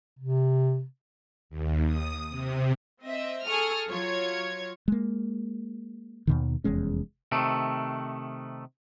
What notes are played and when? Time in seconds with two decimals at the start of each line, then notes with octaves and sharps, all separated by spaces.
0.19 C3
1.50 D#2
1.85 D#6
2.29 C3
3.02 C4 D#5 E5
3.46 G#4 A4 C#6 D#6 F6
3.88 F#3 F4 C#5 G#6
4.88 G#3 A#3
6.27 D#2 B2 D#3
6.64 F1 E2 G#3 C#4
7.32 C3 D#3 A3